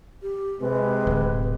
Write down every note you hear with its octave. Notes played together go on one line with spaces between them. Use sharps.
G4
C3 G#3 B4
D1